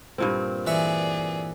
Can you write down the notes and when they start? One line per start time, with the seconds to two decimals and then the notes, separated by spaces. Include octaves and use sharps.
0.18 G2 A#2 C4
0.67 E3 G#4 D5 E5 C#6